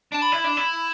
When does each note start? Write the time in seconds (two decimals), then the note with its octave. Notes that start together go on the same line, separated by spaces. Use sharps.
0.12 D4 A5
0.22 B5
0.32 E4
0.44 D4
0.57 E4